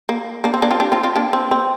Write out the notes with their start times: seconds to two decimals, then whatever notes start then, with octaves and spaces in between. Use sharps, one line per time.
0.09 A#3
0.44 A#3 D4
0.54 C4
0.62 A#3 D4
0.71 C4 F4
0.80 D4 G4
0.92 C4 F4
1.03 C4 F4
1.16 A#3 D4
1.33 C4
1.51 C4